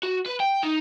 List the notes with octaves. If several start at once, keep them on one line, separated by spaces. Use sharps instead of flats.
F#4
B4
G5
D#4